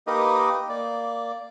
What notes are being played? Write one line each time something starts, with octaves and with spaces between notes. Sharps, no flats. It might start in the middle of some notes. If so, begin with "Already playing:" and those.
A#3 D#4 G4 A#4 B4 D#5
A#3 D5